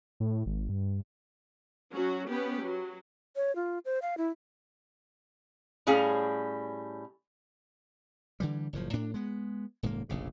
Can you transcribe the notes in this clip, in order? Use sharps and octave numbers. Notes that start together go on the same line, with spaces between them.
A2
G#1
G2
F#3 C#4 F#4
B3 C#4 G4 B4
F#3
C#5
F4
C5
F5
E4
A2 G3 C#4 G#4 F5
D3 E3 G3
F#1 A2 F3
A2 D4
G#3 B3
D#1 G#2 C3 A#3
F1 A#1 C#3